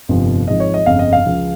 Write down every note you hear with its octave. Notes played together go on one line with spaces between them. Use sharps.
G1 F2 C3 F3
G#1 G#2 F3 D#5
C#5
D#5
G1 F2 C#3 F5
D#5
F5
C#2 C#3 F3